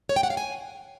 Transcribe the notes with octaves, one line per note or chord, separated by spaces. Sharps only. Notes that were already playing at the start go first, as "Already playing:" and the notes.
C#5
G5
F#5
F5
G#5